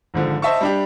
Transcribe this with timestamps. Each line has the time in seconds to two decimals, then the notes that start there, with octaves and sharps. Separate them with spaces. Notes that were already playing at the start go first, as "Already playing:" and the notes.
0.14 G#1 G#2 D3 F3
0.42 C5 D#5 E5 A5 C#6
0.61 G3 D4 G4